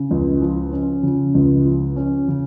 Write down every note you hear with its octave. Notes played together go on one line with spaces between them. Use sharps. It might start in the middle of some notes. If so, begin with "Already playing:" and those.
Already playing: C#3
C#2
F3
C#4
C#3
C#2
F3
C#4
C#3